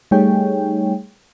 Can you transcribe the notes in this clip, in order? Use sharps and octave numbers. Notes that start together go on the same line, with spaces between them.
G3 A3 D#4 G#4 C#5 G5